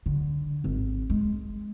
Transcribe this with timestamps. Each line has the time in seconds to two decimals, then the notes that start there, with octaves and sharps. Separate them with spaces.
0.06 D3
0.64 G#1
1.10 G#3